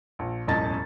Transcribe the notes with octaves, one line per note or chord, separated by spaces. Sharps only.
A#1
E1 A1 F#2 D#5 A5 A6